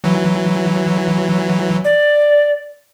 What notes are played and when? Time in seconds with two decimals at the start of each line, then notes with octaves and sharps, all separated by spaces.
0.04 E3 F#3
1.84 D5